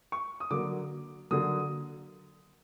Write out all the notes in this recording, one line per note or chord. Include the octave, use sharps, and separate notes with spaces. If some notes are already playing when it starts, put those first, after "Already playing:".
C#6
D#6
D3 F#3 A#3 D6
D3 F#3 A#3 D#6